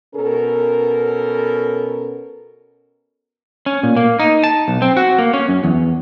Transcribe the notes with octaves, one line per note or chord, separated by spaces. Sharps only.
B2 C#4 A4 A#4
C#4
A#2
A#3
D#4
A5
B1
C4
F#4
A#3
C#4
F#2
E2